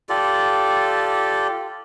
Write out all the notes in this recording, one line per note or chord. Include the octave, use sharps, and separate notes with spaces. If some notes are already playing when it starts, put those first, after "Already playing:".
F4 G4 A4 D5